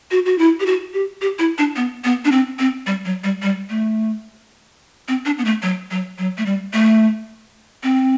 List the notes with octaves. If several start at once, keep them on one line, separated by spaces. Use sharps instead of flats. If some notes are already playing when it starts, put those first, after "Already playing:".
F#4
F#4
E4
G4
F#4
G4
G4
E4
D4
B3
B3
D4
C4
C4
G3
F#3
G3
G3
A3
C4
D4
B3
A3
F#3
F#3
F#3
A3
G3
A3
C4